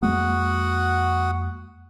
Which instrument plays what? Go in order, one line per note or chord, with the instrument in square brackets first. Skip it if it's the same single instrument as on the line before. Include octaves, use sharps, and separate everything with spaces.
[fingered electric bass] F2 G#3 A#3 [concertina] F#4 F#5 D#6